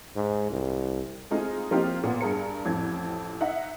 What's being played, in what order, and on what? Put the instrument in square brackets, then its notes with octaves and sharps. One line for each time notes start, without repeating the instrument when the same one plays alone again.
[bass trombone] G#2
C2
[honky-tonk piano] G#3 A3 C4 D#4 F4 G#4
F3 A#3 C4 D#4 F4 G4
A#2 B3
G2 G#4 A#4 C#7
A1 F2 G#6
D#4 E5 F#5